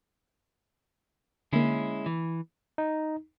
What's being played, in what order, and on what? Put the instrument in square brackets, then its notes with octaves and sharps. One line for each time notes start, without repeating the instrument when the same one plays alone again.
[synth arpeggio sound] D3 A#3 [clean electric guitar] G#3 C#4 E4
[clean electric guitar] E3
[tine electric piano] D#4